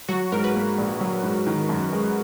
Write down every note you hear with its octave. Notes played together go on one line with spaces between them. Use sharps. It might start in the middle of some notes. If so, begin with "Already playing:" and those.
F#3 F#4
G#2 A#4
B4
A#3
A#1
F#3
G#2
D#3
F#2
G#3